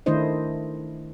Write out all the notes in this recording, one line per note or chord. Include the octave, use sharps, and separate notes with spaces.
D#3 A3 D4 E4 C5 D#5